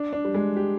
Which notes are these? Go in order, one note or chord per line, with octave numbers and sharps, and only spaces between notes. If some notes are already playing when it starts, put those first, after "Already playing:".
Already playing: D4
D4
G3
G#3
G4